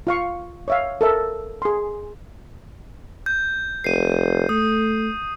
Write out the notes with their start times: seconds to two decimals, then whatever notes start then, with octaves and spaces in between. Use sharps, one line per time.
0.07 F4 F5 C#6
0.68 C#5 E5 F5
1.01 A4 A#4 E5
1.62 G#4 C6
3.26 G6
3.84 F1 C7 D#7
4.49 A3 D#6